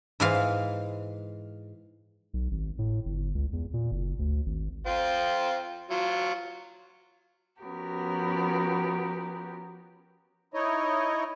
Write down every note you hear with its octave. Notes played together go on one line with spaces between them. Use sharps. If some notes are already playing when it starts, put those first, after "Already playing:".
G#2 E3 F5
B1
G#1
A2
G1
C#2
E2
A#2
F#1
D2
G#1
C4 F4
F#3 F4
F3 B3 C#4 F#4 G4 A#4
D#4 E4 C#5 D#5